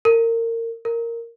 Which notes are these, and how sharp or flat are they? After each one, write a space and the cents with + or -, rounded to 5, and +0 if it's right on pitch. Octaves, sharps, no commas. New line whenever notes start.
A#4 -25
A#4 -10